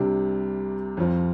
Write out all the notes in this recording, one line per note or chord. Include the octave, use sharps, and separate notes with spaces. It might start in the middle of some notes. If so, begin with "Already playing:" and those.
Already playing: C2 C3 G3 D4
F2 F3 C4 F4